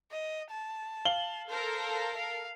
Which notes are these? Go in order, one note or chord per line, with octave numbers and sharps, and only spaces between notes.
D#5
A5
F5 F#7 G7
A4 A#4 C5
F5